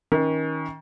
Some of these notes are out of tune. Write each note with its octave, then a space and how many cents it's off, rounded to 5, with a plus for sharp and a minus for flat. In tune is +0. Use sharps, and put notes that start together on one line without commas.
D#3 +25 C#4 +0